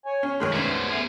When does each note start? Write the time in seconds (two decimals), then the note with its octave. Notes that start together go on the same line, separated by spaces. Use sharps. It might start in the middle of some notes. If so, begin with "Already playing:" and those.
0.06 C#5 G#5
0.23 C#4
0.40 B1 D#3 G#3 C#5
0.52 C2 F#2 A3 B3 C5 B6
0.88 A3 B3 G#4 A#4